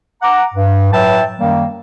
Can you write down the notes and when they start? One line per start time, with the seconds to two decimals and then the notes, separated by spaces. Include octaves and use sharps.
0.22 F#5 A#5 D6
0.55 G2
0.92 A2 F#3 B4 E5 G5 A5
1.39 F#2 D#3 G3 A#3